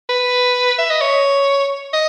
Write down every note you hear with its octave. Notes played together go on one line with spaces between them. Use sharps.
B4
E5
D#5
C#5
D#5